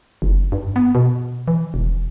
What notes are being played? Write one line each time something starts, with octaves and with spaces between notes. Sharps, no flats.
F#1
G2
B3
B2
E3
E1